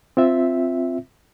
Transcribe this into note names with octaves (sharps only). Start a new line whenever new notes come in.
C4 F4 E5